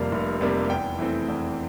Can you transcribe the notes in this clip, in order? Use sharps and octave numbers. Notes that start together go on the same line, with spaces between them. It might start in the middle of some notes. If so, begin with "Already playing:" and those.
Already playing: F1 F2 C3 G3 A#3 F5
F1
F2 C3 G3 A#3
E2 G5
E3 A3 C4
E2